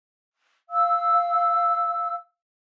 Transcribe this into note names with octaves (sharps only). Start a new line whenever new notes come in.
F5 E6